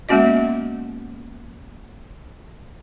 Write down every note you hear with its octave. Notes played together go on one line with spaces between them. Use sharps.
G#3 A#3 B3 C#4 F#4 D#5